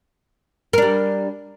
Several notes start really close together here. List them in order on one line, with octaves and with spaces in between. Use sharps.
A#4 D4 G3